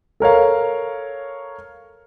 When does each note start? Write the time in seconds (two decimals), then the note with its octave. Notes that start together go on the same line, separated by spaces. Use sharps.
0.20 A4 A#4 C#5 F5